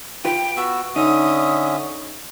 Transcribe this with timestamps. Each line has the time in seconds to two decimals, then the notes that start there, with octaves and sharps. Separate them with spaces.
0.25 F4 B4 G5
0.57 B3 F#4 E6
0.96 D3 C#4 D#4 E5 D#6